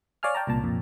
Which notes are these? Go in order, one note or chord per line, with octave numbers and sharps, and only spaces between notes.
C#5 D5 F5 G#5 F6
G5 A5 A#5
C2 A#2 A5
F2 A#2